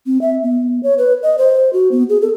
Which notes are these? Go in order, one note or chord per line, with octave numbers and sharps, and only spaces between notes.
C4
E5
B3
C#5
B4
D#5
C5
F#4
B3
G#4
A4